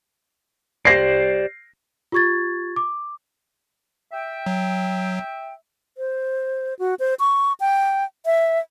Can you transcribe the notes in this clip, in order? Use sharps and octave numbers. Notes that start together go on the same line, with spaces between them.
G4 C5 D5 A#6 C7
F4 G4 C#6 G#6 A6
D6
E5 G5
F#3
C5
F#4
C5
C#6
G5
E5